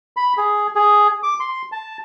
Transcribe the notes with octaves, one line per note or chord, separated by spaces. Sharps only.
B5
G#4
G#4
D6
C6
A5